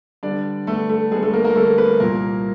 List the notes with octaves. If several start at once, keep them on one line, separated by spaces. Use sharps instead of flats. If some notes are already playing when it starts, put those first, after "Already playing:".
D3 G3 B3 D4 D5
D3 G3 A3 B3 A4
A3 A4
D3 G3 G#3 B3 G#4
A3 A4
A#3 A#4
A#3 A#4
D3 G3 A3 B3 A4
B3 B4
C2 A#2 F3 A#3 A#4